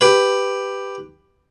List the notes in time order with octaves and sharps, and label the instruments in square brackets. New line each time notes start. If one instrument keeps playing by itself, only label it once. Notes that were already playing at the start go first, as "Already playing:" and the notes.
[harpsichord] G4 B4